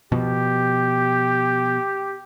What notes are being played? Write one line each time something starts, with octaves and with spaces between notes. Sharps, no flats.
B2 F3 G4